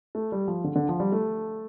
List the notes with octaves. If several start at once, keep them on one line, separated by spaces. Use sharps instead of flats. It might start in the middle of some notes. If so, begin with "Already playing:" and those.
A3
G3
F3
D3
D3
F3
G3
A3